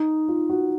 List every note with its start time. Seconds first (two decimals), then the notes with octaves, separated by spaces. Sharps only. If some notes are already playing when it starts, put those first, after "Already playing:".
Already playing: D#4
0.28 F4
0.50 F#4